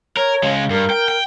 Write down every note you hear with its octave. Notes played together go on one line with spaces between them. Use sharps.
A#4 C#5
C#3 G#3
G2 A#4
G5
G5